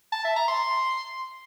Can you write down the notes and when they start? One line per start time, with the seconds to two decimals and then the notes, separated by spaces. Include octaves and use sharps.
0.13 A5
0.24 E5
0.36 A#5
0.48 C6